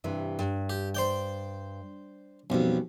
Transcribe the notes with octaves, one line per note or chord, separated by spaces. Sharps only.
G2 C3 E3
G2
G4
C5 D5 G5
B1 F2 B2 G3 C#4